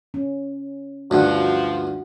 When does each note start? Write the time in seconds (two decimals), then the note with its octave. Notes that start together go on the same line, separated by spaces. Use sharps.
0.14 C#4
1.11 D2 G2 F3 F#4 F#5